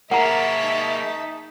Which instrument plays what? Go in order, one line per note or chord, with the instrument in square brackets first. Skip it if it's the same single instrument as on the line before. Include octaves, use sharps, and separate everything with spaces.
[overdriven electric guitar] A#3 G#4 [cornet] A#4 [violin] E5 A5 [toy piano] F#5 A#5
[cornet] D#4